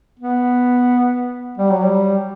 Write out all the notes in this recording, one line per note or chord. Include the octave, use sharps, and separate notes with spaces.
B3
G3
F#3
G3